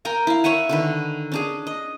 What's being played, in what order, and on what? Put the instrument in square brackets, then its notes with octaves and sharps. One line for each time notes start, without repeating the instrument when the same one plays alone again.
[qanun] A#4 G5 G#5 A#5
E4 F5
C#5 E5 F#5 G#5
D3 D#3 B4
C#4 D4 G#4
D#5